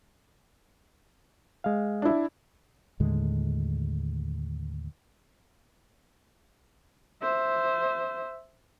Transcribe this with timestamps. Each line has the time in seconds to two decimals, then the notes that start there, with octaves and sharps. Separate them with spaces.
1.64 G#3 F5
2.02 D4 E4
3.00 D#2 A2 D3 G#3
7.22 C5 E5